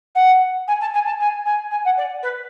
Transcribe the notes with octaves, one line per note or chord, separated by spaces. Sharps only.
F#5
G#5
A5
G#5
A5
G#5
G#5
G#5
F#5
D5
B4